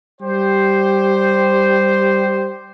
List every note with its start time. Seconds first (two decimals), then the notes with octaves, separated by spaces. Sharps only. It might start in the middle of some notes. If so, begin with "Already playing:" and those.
0.21 G3 G4 C5